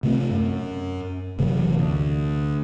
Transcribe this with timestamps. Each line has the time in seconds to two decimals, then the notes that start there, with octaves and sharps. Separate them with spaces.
0.03 C3 A3 C4
0.31 F#2
1.38 F#1 C3 E3 F#3
1.78 D2